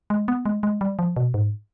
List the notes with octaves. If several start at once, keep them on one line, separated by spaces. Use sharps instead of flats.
G#3
B3
G#3
G#3
G3
F3
B2
G#2